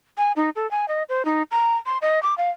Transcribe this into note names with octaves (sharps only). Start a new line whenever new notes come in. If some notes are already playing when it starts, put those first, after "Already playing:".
G#5
D#4
A4
G#5
D#5
C5
D#4
A#5
C6
D#5
D6
F5